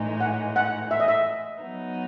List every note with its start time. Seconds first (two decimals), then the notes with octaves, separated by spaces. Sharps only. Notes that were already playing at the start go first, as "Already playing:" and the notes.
Already playing: A2 E3 G#3 D#4
0.21 F#5
0.56 F#5
0.91 E5
1.00 D#5
1.08 E5
1.62 F#3 B3 D#4